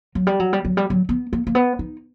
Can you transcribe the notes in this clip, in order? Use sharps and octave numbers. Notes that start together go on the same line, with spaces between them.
F#3
G3
F#3
G3
F#3
G3
F#3
B3
A#3
A#3
B3
D#4